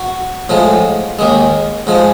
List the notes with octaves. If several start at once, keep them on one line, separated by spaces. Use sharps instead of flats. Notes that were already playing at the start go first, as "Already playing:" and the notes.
Already playing: F#4
A2 F3 G#3
D#2 D#3 G#3
G#2 F3 G#3